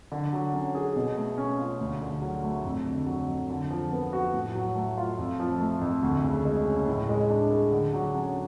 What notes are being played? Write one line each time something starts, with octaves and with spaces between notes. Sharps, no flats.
D3
F#3
C#4
G#4
B2
A3
C#4
F4
D2
D3
F#3
A3
F2
D3
F#3
F2
D3
F3
B3
F#4
A2
F#3
A3
F4
F2
F3
A3
F2
D2
C#3
G#3
C#4
A2
G#3
D4
G#4
D3
F#3
C#4